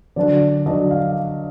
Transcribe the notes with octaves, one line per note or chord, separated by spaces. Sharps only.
D3 F#3 D4 D5
D3 F#3 D4 D#5
F5